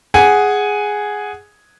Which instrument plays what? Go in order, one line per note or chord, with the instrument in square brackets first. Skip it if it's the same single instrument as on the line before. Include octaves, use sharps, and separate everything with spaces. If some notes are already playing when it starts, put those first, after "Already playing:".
[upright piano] G#4 F#5 G#5